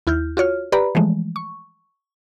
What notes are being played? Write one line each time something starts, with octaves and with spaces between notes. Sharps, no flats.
D#2 E4 F6 G6
F4 F#4 C#5 F6
G4 B4 D5 A#5 B5
E3 F3 G#3 A3
C#6